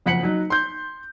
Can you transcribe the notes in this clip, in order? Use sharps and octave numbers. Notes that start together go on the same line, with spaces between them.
F#1 F2 F#5 B6 C#7 F#7
F#3 D#4
C6 G6